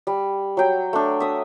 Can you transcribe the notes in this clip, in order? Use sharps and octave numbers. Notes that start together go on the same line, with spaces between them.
G3
F#3 G5
A3 D4
E5 D#6